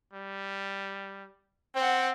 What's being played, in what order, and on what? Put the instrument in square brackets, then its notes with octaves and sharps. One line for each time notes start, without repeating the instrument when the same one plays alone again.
[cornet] G3
[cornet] C4 [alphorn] C5 [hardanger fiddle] F#5 G5